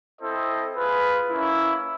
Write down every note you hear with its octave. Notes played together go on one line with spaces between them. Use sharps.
C4 E4 A4 C5 D#5
F4 G#4 B4
A#3 C#4 E4